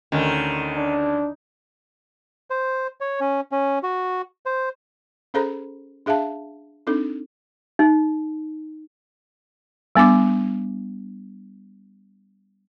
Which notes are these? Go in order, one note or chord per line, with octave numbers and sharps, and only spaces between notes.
D2 D3 D#3 C#4
D4
C5
C#5
C#4
C#4
F#4
C5
C#4 G#4 A4 C5 A#5 B5
D4 G#4 E5 F5 A5
C4 D4 D#4 A4
D#4
G3 B3 D4 D6